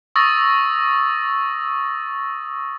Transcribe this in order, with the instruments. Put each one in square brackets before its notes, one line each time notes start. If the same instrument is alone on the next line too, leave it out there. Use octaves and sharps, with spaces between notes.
[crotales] C#6 D#6 E6 A6 A#6